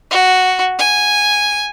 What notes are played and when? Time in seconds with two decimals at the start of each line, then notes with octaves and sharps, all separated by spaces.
0.11 F#4
0.79 G#5